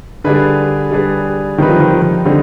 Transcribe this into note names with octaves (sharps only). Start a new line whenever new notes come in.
D3 G3 D4 G#4 B4
G3 D4 G#4 B4
D#3 G3 C4 D#4 B4
F3
D#3
F3
D#3
D3 G3 C4 D#4